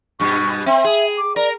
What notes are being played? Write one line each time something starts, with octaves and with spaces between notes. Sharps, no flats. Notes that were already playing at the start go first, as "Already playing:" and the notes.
G2 B2 C#6
C4 E5
G#4
D6
A#4 D5